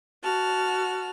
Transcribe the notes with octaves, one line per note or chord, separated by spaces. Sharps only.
F#4 A5 F6